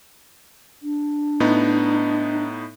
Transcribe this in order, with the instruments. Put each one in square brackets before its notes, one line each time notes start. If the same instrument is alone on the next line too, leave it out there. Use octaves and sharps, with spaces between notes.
[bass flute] D4
[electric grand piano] A2 B3 D#4